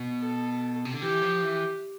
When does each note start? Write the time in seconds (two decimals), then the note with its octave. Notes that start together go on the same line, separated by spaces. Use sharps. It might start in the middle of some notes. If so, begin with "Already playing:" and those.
Already playing: B2
0.22 A4
0.85 C3
0.94 D3
1.02 E3 G4
1.22 F3
1.42 E3